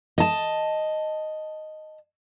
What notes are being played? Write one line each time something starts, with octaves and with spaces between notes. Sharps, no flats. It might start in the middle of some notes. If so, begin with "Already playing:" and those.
D#5 A5